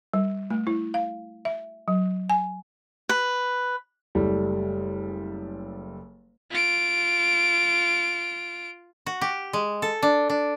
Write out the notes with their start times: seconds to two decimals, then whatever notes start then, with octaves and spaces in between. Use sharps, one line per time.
0.13 G3
0.50 A3
0.67 E4
0.94 F5
1.45 E5
1.88 F#3
2.30 G#5
3.09 B4
4.15 F#1 G3 A3
6.51 F4 D7
9.06 F#4
9.21 G4
9.53 G#3
9.82 A4
10.03 D4
10.30 D4